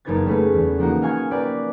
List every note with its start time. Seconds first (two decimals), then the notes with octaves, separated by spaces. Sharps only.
0.05 F#1 A#3 D#4 B4 G#6 A6
0.26 G3 A3 C#4 G#4 B4
0.53 E2
0.78 F3 A#3 D#4 F#4
1.02 D#5 F5 G#5 C#6 G#6
1.31 A#3 B4 D5 G5